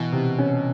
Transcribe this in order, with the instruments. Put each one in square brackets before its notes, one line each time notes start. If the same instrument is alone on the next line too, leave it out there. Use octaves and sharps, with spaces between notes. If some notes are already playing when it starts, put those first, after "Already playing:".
Already playing: [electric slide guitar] B2 [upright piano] E3
[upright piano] C3
C#4